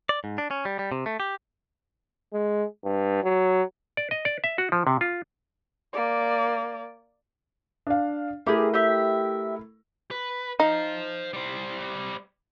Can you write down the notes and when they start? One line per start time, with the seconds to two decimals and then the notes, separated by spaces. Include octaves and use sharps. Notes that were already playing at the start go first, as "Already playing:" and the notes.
0.09 D5
0.24 G#2
0.38 D4
0.51 C#4
0.65 G3
0.79 G3
0.92 C3
1.06 A3
1.20 G4
2.33 G#3
2.84 G2
3.24 F#3
3.97 D5
4.11 D#5
4.25 D5
4.44 E5
4.58 F#4
4.72 F3
4.87 C3
5.01 F4
5.93 A#3 D5
7.87 D4 F5
8.46 A3 E4 G4 G#4 A#4
8.74 G4 E5
10.11 B4
10.60 D#4 C5 F5
11.33 G3 C5